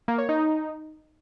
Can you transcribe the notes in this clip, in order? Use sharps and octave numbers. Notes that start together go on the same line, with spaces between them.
A#3
C#5
D#4